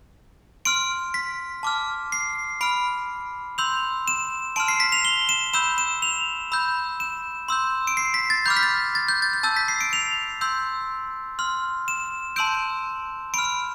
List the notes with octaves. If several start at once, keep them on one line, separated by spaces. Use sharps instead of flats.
C6 F6 D7
B6
A5 D6 F6
C7
B5 F6 D7
C6 E6 G6 F7
E7
A5 C6 F6 D7
C7
B6
F7
G7
E7
B5 E6 G6 E7
E7
F7
B5 E6 G6
E7
C6 E6 G6
D7
C7
B6
A6
B5 D6 F6 G6
B6
A6
A6
G6
A6
G6
A5 E6 G6 A6
B6
C7
D7
F7
C6 E6 G6
C6 F6
E7
A5 C6 E6 G6 D7
B5 F6 D7